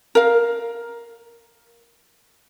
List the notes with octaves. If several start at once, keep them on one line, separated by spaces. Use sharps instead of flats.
A#4 F5